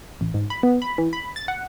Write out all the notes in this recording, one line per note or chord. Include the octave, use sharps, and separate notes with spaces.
A1
G#2
B5
B3
B5
E3
B5
A6
F#5